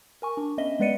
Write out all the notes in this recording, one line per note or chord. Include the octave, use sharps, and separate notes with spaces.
A#4 G#5 C#6
D4
B3 C#4 D#5 E5 G7
G#3 B3 B4 D5 C#7 D#7